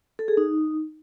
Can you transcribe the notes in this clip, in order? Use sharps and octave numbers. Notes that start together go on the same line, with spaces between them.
A4
G#4
D#4